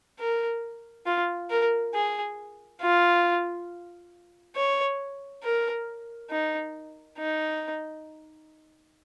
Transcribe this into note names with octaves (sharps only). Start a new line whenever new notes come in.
A#4
F4
A#4
G#4
F4
C#5
A#4
D#4
D#4